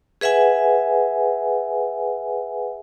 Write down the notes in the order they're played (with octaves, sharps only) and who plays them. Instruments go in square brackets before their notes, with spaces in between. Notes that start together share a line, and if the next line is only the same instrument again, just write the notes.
[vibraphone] G#4 B4 E5 F#5 G#5